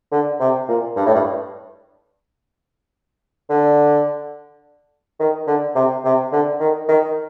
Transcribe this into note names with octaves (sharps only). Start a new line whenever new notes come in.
D3
C3
A#2
G2
A2
G2
D3
D#3
D3
C3
C3
D3
D#3
D#3